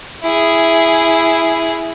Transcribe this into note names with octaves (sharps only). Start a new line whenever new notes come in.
E4 G#4